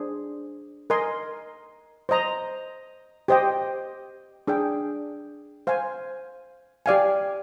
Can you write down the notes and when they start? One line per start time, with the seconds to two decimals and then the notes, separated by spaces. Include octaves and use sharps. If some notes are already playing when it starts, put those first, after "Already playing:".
Already playing: D4 G#4 C5
0.90 A#4 D#5 G#5 C6
2.09 C5 D#5 A#5
3.28 G4 C5 D#5 G5
4.47 D4 G#4 D5 G5
5.67 C5 F5 G#5
6.86 G4 D5 F5 G#5